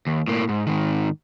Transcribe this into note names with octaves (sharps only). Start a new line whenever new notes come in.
D#2
A2 A#3
G#2
G#2 D#3